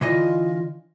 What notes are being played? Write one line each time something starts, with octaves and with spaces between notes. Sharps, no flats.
D3 E3 F4 D#5